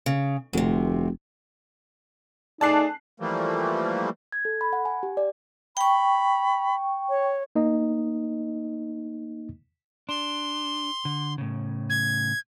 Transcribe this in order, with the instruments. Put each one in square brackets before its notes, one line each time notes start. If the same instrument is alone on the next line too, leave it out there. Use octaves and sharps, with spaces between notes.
[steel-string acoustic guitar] C#3
[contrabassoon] F1 [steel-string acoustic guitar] D2 C3
[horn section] A3 G#4 D5 [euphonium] D#4 [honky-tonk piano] A5 F#6 C7
[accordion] E3 F3 G3 A3 A#3
[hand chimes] G#6
A4
B5
F#5
G#5
G4
D5
[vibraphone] G5 C#6 [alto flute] B5
[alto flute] C#5
[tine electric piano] A#3 D#4 D#5
[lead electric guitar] D4 [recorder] C6
[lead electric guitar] D3
A2 C#3
[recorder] G#6